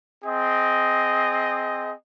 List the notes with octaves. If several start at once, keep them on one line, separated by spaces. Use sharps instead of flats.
C4 G#4 D#5